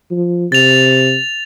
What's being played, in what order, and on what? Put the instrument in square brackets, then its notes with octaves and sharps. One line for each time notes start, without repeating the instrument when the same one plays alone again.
[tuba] F3
[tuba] C3 [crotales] A6 F7